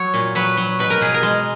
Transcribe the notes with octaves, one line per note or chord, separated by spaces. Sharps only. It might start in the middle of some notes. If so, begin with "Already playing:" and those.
Already playing: F#3 C#5
A#2
F#3 B4
F#3
B2 B4
A#4
B2 G#4
A#4
G#3